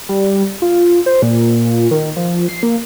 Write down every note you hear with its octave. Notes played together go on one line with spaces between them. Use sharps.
G3
F4
C5
A#2
D#3
F3
C7
A#3